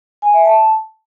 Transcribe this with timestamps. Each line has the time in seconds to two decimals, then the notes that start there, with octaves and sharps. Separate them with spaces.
0.22 G#5
0.34 E5
0.45 A5